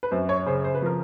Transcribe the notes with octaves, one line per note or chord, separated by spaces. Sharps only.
B4
F#2 C5
C#5
C#3 C5
C5
B4
F3 A#4